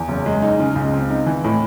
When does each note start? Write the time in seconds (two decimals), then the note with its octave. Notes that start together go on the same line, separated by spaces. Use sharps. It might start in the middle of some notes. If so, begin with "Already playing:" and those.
Already playing: E2
0.09 F#1
0.26 G#3
0.42 D#4
0.60 C#3
0.76 C#2
0.93 C4
1.10 D#4
1.26 E3
1.45 A2